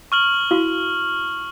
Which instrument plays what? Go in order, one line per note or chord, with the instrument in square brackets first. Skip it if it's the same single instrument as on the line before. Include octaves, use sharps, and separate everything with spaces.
[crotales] C#6 F6 F#7
[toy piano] E4 F#4 F5